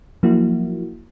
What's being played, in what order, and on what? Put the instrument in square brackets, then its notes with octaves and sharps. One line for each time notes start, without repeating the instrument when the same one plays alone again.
[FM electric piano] F3 F#3 A#3 E4 F#4